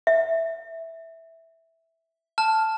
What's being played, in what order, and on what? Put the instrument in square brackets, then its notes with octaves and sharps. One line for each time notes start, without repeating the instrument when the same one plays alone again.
[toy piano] E5
[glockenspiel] A5 F6